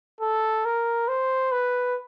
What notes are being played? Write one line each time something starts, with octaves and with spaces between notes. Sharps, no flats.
A4
A#4
C5
B4